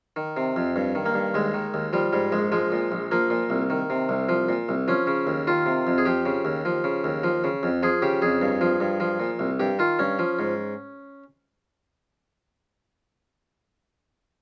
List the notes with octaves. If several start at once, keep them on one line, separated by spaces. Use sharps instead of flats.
D#3
C3
F2
G2
D#3
A#3
G2
D#2 G#3
D#3
D#2
F3 G3
G#2 G3
A#1 G#3
F3 G#3
A#2
A#1
F3 A#3
A#2
C2
D#3
C3
C2
F3
A#2
C2
F3 C#4
C#3
D#2
D#3 F4
C3
F2
G#4
F3 G4
C#3
D#2
F3
C#3
D#2
F3
C#3
F2
F3 G#4
C#3 G4
F2 G#4
G2
F3
G2
F3
A#2
C2
G2 G4
D#3 F4
G2 C#4
F3
G#2